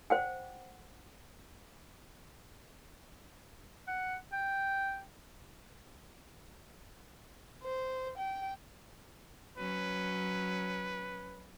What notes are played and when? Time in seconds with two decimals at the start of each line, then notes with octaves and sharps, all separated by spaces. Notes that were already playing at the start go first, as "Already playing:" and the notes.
0.10 C5 F#5 G5
3.87 F#5
4.32 G5
7.63 C5
8.17 G5
9.57 F#3 C#4 B4